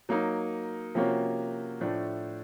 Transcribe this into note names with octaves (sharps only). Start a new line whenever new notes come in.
F#3 A#3 D#4
C3 F3 A#3 C#4 F#4
A2 F3 A3 D4